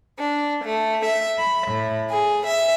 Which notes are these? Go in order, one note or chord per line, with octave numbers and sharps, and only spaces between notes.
D4
A3
E5
B5
A2
G#4
E5